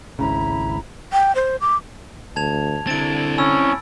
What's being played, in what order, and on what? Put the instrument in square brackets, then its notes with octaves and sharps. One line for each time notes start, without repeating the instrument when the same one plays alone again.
[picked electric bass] G#1 C#2 C#3 [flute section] E4 A#5 B5
[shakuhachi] G5
C5
D6
[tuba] D2 [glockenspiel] A5 G#6 F7
[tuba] D3 [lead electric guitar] C4 E4 [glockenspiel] A6 D7
[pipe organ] C#4 [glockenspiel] B5 E6